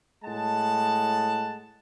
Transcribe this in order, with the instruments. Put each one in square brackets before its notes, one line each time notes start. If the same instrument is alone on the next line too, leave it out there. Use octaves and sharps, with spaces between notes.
[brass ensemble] A2 G#3 F#5 A5